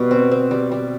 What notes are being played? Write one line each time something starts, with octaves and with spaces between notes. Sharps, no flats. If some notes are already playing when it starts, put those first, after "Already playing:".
Already playing: B2 G3
C4
C4
G3
G3